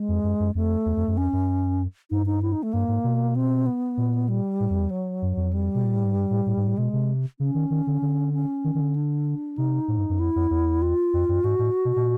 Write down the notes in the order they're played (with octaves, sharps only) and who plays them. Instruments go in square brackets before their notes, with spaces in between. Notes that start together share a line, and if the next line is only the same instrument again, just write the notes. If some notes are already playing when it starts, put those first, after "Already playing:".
Already playing: [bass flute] G#3
[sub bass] F2
F#2
F#2
[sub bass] F2 [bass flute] A3
[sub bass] E2
F2
F#2
[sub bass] F2 [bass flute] C#4
[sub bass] F#2
[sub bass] G2 [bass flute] D#4
[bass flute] D#4
E4
D#4
A3
[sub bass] G2 [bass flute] A#3
[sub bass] G#2
B2
[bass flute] C4
B3
[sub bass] A#2
[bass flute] G3
[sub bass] A2
F2
E2
[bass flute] F#3
[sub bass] F#2
F2
[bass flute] G3
[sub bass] B2
A#2
A2
G#2
G2
A2
A2
G#2
A2
[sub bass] B2 [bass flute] G#3
[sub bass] C3
[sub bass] C#3 [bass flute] C#4
[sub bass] D#3
D#3
D3
D3
[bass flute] C#4
[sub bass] D#3
D#3
D3
[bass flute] D4
[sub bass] C3 [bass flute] D#4
[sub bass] A2
G2
F#2
[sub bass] F2 [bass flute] E4
[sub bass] F2
E2
[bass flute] F4
[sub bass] F2
F#2
[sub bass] G#2 [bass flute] F#4
[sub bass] A2
B2
A#2